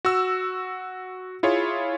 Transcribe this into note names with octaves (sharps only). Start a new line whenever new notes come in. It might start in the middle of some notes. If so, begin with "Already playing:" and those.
F#4 E6
E4 F4 G#4 C#5